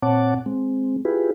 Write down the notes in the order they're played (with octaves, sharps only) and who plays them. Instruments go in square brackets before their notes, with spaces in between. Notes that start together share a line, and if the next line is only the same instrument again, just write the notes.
[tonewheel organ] A#2 C4 C#5 F#5 A5 D6
G#3 C4
E4 F4 G4 G#4 B4